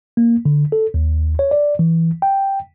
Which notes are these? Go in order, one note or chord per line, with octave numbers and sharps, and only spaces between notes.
A#3
D3
A4
D#2
C#5
D5
E3
G5